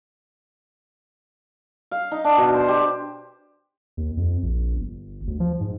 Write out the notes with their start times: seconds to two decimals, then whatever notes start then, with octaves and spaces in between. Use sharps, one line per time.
1.91 F5
2.11 D#4
2.24 D4
2.37 B2
2.54 C5
2.68 G4
3.97 D#2
4.17 F2
4.42 A#1
4.76 G1
5.27 D2
5.40 F3
5.60 G#2